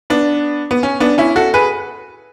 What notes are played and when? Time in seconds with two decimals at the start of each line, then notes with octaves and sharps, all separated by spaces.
0.10 B3 D4
0.71 B3
0.83 C#4
1.00 B3 D4
1.18 C#4 E4
1.36 F#4 A4
1.54 G#4 B4